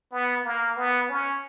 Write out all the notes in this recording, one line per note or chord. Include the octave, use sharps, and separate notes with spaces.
B3
A#3
B3
C#4